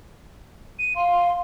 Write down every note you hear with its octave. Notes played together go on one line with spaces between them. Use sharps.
D#7
F5 C6